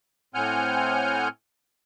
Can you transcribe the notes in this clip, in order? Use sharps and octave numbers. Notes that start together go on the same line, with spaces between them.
A2 C4 F#5 G#5 F6 G6